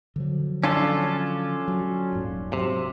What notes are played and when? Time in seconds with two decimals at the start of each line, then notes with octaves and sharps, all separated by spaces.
0.16 D3 F3 F#3
0.64 C#4 D4 F4 A4
1.68 F#3
2.12 D#1 G#2
2.53 C3 F#3